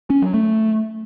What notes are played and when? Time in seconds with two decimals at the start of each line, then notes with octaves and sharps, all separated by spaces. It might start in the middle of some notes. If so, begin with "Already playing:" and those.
0.10 C#4
0.22 F#3
0.34 A3